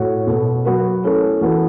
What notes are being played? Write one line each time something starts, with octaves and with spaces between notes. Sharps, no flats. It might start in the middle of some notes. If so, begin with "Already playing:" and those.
Already playing: A2 A3 F#4 C#5
B2 B3 A4
F#3 B3 F#4 B4
A3 C#4 E4 A4 C#5
E3 B3 F#4 A4